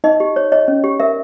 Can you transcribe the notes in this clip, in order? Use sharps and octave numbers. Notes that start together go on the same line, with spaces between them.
D#4 D#5
G4
C#5
C#5 D#5
C#4
G4
A#4 E5